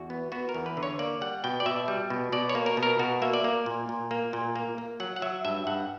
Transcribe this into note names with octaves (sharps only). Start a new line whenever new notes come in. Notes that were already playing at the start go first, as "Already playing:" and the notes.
Already playing: E2 F#4
B3
B3 F#4
A#4
E2
B4
D3
C#5
A#3 D5
G3 F#5
B2 G5
D5
B2 E5
G3
B2
B2 D5
C#5
A#3
A#4
B2
A#4
B2 F#4
A#3 E5
D5
A#3
A#2
A#2
A#3
A#2
A#3
A#3
F#3 F#5
F#5
F#3 E5
G2 E5
G2 F#5